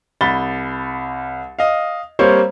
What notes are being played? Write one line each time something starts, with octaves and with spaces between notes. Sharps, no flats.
C2 B5 A6 G7
D#5 F5
G3 A#3 C4 C5 C#5 F5